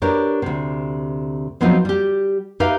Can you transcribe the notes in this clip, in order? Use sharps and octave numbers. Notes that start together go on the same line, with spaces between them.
D4 G4 A#4 B4 C#5
D2 C3
F3 F#3 B3 C4 D#4 F4
G3 G4
D#4 G4 B4 E5 F5